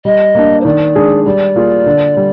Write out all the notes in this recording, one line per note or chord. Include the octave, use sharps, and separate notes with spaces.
G3 D#5
A#3 D4
C5
D#3 D5
G#3 D4 G#4
G3 D5
A#3 F4 G#4
D3
G3